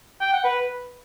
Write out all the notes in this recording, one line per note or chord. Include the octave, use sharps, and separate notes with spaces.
G5
F#5
B4